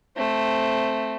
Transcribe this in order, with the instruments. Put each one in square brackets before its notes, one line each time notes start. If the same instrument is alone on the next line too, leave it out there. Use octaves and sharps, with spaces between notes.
[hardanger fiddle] A3 C4